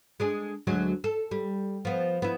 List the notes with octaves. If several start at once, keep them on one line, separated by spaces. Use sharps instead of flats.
G#3 D4 G#4
D2 F#3 G#3
A4
G3
F3 B3
B3 E4